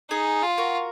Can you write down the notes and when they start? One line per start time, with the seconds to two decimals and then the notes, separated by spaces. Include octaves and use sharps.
0.10 D#4 G#4
0.43 F4
0.58 F#4 A#4